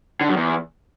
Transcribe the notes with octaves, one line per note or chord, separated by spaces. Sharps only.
D3
F#2
E2